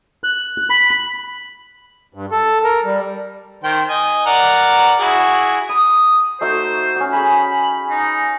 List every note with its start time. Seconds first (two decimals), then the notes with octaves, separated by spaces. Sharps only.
0.24 F#6
0.70 B5
2.14 G2
2.32 A4
2.64 A#4
2.85 G3
3.64 D#3 C5 G5
3.89 D#5 G#5
4.26 A#4 D5 F#5
5.00 E4 F#4 G#4
5.69 B5 D#6
6.41 A3 D#4 F#4 C5
6.96 C#4 F#4
7.13 G#4 G#5 B5
7.91 D#4